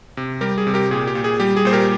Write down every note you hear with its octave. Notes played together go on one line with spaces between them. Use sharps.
C3
G3 G4 A#4
G#4
C3
G4 A#4
A#2 G#4
G4
A#2
G#4
G3 G4
G#4
A#2 C5
G4 A#4